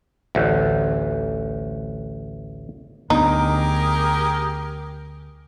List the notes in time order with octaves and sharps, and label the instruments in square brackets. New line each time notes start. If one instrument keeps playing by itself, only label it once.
[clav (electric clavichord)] A1 D2
[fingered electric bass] D2 B3 D4 [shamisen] D#4 [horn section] G4 G#4 A#4